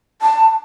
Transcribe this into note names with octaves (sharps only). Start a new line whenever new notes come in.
A5